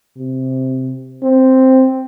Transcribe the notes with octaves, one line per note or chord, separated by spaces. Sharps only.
C3
C4